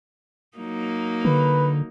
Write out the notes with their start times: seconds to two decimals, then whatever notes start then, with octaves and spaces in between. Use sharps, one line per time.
0.58 F#3 A#3 D#4
1.25 D3 B4